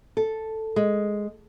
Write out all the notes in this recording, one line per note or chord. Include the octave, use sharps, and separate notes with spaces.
A4
G#3